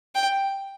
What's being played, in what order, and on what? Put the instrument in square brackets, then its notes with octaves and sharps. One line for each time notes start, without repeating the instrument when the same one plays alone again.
[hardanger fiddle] G5